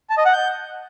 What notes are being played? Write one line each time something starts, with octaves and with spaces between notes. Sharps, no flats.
A5
D#5
F#5
G6